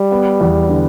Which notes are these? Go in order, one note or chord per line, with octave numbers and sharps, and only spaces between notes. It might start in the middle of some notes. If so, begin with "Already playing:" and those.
Already playing: G3
B3
E2
D3